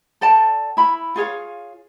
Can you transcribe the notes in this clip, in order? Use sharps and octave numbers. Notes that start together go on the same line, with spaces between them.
A4 D5 G5 A5
E4 B5
F4 G#4 C#5 F5